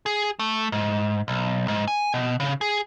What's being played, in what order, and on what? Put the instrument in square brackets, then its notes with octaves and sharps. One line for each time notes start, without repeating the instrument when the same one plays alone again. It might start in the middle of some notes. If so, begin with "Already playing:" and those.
[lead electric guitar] G#4
A3
G#2
B1
G#2
G#5
B2
C#3
G#4